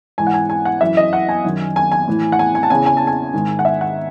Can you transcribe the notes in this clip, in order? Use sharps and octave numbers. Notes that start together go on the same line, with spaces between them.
G#2 E3 G#5
F#5
G#5
G#5
F#5
F#2 E3 E5
D#5
F#5
G#5
F#2 D#3
G#5
G#5
A2 E3
F#5
G#5
G#5
A5
E2 C#3 E3 G#5
G#5
A5
G#5
G#2 D#3
F#5
E5
F#5